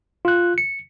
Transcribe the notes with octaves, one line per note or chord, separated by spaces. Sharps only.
F4 F#6
C#7